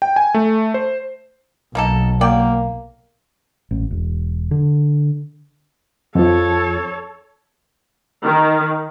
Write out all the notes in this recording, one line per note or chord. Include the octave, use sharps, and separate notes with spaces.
G5
G#5
A3
C5
B1 A#3 D#4 A4
F#3 A#3 D5 G5
A1
E1
D3
F2 F3 A4 C#5
D#3